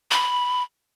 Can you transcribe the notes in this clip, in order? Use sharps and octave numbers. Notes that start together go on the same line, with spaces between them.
B5